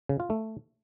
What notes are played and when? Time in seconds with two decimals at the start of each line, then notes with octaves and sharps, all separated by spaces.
0.09 C#3
0.20 F4
0.30 A3